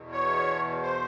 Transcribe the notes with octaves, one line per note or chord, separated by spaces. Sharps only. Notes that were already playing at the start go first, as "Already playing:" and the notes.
Already playing: E2 B2
C#5
C5